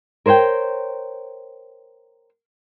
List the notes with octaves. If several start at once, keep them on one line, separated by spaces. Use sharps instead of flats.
A#4 C5 C#5 F#5 G5